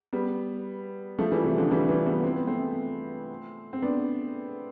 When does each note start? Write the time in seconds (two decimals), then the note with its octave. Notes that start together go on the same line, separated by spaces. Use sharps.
0.13 G3 B3
1.19 F3 A3
1.32 E3 G3
1.44 C3 E3
1.58 D3 F3
1.71 E3 G3
1.89 E3 G3
2.06 G3 B3
2.24 C4
2.36 B3
2.47 A3 C4
3.73 C4
3.82 B3 D4